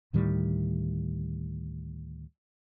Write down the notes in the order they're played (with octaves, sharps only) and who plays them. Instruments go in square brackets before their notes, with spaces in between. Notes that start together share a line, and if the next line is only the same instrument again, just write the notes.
[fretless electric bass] D2 A2 D#3 G3